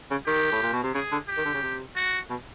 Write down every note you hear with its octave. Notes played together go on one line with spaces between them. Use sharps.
C#3
D#3 G4
A2
A#2
B2
C3
C#3 G#4
D3
G4
D#3
D3
C#3
C3
F#4
B2